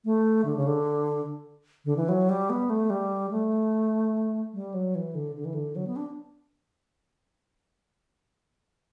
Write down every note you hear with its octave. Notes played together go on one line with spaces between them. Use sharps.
A3
D3
C#3
D3
D3
E3
F#3
G3
B3
A3
G3
A3
G3
F#3
E3
D3
D3
E3
D3
F#3
B3
D4